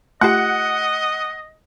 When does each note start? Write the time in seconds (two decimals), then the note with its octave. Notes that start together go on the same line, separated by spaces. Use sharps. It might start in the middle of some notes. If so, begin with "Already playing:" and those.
0.21 A3 F4 G4 D#5 F#5